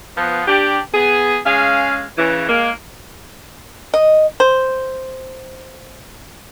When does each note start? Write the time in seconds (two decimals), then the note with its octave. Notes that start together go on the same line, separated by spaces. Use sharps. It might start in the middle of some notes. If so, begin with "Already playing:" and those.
0.16 F3 B3
0.47 D4 G4
0.93 B3 G#4
1.45 G#3 C#4 G#4 F5
2.17 C#3 E3
2.48 G#3 A#3
3.94 D#5
4.40 C5